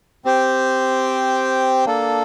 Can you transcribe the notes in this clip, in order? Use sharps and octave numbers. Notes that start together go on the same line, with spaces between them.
C4 G4 C5 G5
A#3 D4 A4